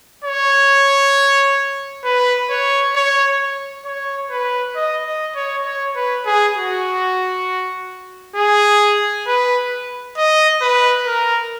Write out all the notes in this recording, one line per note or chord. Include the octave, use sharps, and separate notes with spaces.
C#5
B4
C#5
C#5
C#5
B4
D#5
D#5
C#5
C#5
B4
G#4
F#4
G#4
B4
D#5
B4
A#4